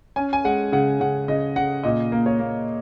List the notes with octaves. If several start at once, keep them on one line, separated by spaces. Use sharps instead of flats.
C#4 G#5
G#5
G#3 F#5
C#3 F#5
C#3 F#5
C#3 D#5
C#3 F#5
A#2 D#5
A#3
C#5
A#3